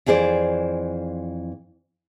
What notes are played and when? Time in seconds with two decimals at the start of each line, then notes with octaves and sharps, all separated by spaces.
0.06 F2 E3 G#4 C5 D5